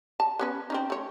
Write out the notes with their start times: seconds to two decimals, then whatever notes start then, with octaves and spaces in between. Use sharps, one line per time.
0.20 A5
0.39 B3 C#4 B4
0.70 C4 C#4 D#4
0.90 A3 C#5